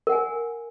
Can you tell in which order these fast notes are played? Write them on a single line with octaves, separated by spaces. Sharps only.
A#4 F#5 G#5